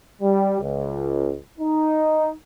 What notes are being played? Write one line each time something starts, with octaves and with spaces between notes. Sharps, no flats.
G3
C#2
D#4